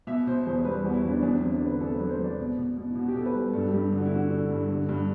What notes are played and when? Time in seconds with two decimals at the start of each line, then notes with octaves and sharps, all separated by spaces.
0.07 B2 E5
0.27 B2 C5
0.45 E2 C5
0.65 G3 B4
0.84 E2 F#4
0.94 E4
1.04 E2 D4
1.22 E2 D4
1.37 F#3 C4
1.52 D4
1.61 D3 B4
1.80 E2 A4
1.95 B4
2.00 F#3
2.09 C5
2.19 F#3
2.24 D5
2.39 B2
2.58 B2
2.77 B2
2.90 E4
2.95 B2 F#4
3.08 G4
3.15 B2 A4
3.26 B4
3.34 G3
3.53 G2 A4
3.68 G4
3.74 G2
3.92 D3 F#4
4.05 E4
4.12 D3 F#4
4.30 D3
4.51 G2
4.70 D3
4.89 G2